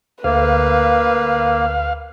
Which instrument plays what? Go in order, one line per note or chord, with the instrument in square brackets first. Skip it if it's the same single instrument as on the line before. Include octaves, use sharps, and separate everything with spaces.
[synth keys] D2 [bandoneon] A#3 [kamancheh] B4 [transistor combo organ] F5